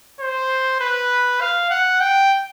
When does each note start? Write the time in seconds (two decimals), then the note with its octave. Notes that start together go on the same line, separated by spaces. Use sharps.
0.20 C5
0.80 B4
1.40 F5
1.70 F#5
2.01 G5